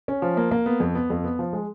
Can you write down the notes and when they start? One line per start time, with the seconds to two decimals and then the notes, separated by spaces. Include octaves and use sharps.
0.08 C#4
0.22 F3
0.37 A#3
0.51 A#3
0.66 B3
0.80 F2
0.95 B3
1.10 F2
1.24 B3
1.39 F3
1.53 G#3